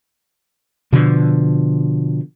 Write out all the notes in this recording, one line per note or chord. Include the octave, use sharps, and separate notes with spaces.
B2 D3 F3